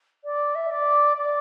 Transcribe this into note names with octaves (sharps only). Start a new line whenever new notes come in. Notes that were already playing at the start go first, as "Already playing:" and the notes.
D5
E5
D5
D5